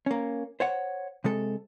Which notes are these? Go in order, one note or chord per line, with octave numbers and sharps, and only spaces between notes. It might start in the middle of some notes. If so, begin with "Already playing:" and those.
A#3 C#4
C5 C#5 F#5
C3 G#3 A4